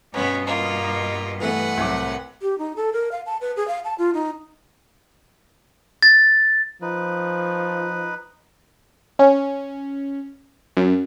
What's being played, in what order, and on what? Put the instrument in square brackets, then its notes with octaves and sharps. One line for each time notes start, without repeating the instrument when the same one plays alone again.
[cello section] G2 B2 D#5 [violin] B3 C#4
[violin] A#3 F4
[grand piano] E3 A3 B3 [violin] B4 F#5
[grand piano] C2 D6 [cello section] A2 F#3
[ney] G4
D#4
A4
A#4
F5
A5
B4
G#4
F5
A5
F4
D#4
[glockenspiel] A6
[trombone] F3 [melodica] D#4 B4
[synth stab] C#4
F#2